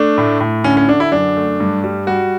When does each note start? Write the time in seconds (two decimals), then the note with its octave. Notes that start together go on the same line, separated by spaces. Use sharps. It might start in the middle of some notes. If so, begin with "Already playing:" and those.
Already playing: A3 D4
0.18 A2
0.40 A2
0.64 D3 C#4
0.77 C#4
0.88 D3 D4
1.00 E4
1.12 F#2 D4
1.36 A3
1.60 G2
1.84 G3
2.07 G3 F#4